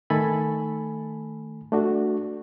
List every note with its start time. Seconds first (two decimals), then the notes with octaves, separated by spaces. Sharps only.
0.10 D#3 A3 A4 G#5 A5 B5
1.72 A3 D4 F#4